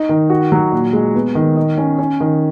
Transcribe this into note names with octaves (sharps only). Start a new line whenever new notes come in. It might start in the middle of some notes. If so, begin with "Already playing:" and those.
Already playing: D#4
D#3
F#4
F#3
A#2
G#3
B3
D#3
D#5
C#4
C#4
D#3